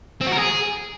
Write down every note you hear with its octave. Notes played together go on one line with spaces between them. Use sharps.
C4
F#4
A#4
G#4